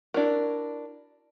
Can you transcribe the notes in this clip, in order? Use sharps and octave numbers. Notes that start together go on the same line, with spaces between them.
D4 E4 F#4 A#4